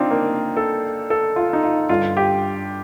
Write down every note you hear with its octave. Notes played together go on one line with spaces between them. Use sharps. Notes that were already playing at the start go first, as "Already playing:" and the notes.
Already playing: C4 D4 D#4 F4
A#3
A4
A4
F4
D#4
F4
G2 D3 F4
G4